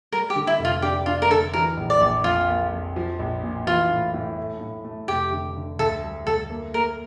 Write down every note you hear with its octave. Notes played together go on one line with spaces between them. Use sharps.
G3 A#4
G4
D3
E4
F1
F4
D4 G4
D4 F4
A#4
D3 A4
E3 A#4
A#1
D5
A#1
F2 F4
A#3
F2
F3
A#1
A#2
E3 F4
A2
A2
A3
A2
A3
F1 G4
D3
D3
D2 A4
G3
D2 A4
A#3
A#3 A#4